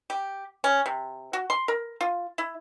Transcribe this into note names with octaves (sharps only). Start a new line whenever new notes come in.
G4
C#4
C3
F#4
C6
A#4
F4
E4